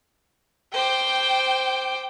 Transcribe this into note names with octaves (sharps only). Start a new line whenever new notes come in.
C5 G5 D6